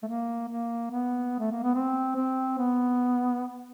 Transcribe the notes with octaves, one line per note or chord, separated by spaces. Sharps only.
A3
A#3
A#3
B3
A3
A#3
B3
C4
C4
B3